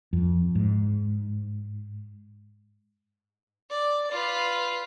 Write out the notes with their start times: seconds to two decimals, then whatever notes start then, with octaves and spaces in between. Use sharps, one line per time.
0.13 F2
0.55 G#2
3.70 D5
4.12 F4 B4